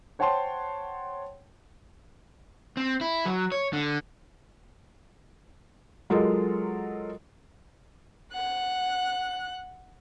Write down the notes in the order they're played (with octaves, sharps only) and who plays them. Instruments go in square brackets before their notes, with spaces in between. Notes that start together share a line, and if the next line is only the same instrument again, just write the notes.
[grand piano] C5 C#5 F#5 G5 A5 C6
[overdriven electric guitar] C4
E4
F#3
C#5
D3
[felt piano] F#3 G#3 F4 A4 A#4 D#5
[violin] F#5 F#6